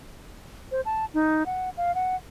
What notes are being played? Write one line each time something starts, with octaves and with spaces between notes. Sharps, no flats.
C5
A5
D#4
F#5
F5
F#5